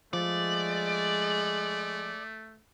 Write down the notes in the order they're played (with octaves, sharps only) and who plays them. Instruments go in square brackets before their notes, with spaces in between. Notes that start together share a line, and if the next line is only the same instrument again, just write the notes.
[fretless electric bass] F3 [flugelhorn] G#3 [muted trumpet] A3 [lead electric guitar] D5